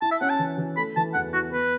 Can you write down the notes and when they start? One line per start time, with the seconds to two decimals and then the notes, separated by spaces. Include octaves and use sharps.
0.02 E4 A5
0.11 E5
0.21 C#4 F#5
0.30 A5
0.39 E3
0.58 E3
0.77 A3 B5
0.96 E3 A5
1.14 E2 F#5
1.33 E4 F#4
1.51 B3 B4